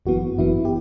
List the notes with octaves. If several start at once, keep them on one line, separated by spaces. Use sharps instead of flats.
G1 F#2 E3 B3 F#4
G1 F#2 E3 B3 E4
G4